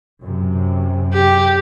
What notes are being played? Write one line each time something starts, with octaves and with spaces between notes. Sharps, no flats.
F#2 C3
G4